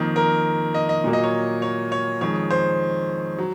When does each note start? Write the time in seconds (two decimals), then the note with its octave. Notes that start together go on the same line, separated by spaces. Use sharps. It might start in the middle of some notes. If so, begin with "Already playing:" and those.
Already playing: F2 D#3 A#3
0.16 A#4
0.74 D#5
0.89 D#5
1.04 A#2 F#3 A#3
1.13 D#5
1.24 C#5
1.62 C#5
1.92 C#5
2.21 F2 D#3 G#3 C#5
2.51 C5
3.38 F#3